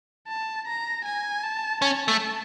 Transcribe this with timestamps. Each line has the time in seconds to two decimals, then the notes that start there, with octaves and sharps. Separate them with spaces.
0.28 A5
0.67 A#5
1.05 G#5
1.43 A5
1.82 C#4 A5
2.08 A3